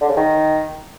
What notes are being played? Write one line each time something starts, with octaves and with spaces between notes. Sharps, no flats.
D3
C#3
D#3